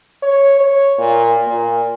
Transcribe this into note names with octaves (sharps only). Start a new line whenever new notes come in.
C#5
C#5
A#2
A#2